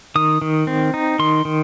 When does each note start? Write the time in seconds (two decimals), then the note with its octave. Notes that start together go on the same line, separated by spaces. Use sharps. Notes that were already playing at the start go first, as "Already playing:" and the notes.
0.15 D#3 D#6
0.42 D#3
0.67 C4
0.94 D#4
1.19 D#3 C6
1.45 D#3